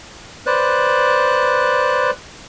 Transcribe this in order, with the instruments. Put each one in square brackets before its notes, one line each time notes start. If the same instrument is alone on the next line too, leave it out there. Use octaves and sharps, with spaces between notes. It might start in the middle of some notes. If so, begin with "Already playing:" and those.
[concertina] B4 C5 D5 F#6